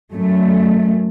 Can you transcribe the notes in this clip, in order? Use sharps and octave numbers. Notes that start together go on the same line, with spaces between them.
F#2 A3